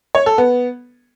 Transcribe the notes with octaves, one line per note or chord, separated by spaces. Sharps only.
C#5
A4
B3